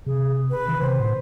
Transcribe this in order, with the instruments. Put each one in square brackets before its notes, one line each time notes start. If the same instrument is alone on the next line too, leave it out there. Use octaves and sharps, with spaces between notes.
[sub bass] C3 [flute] G#4
[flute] B4
[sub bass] D#3
[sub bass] C3 [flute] C5
[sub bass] A2